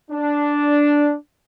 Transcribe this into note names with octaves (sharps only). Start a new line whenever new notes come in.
D4